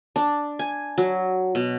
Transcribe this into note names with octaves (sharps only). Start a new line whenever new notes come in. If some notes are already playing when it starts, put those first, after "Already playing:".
D4
G#5
F#3
B2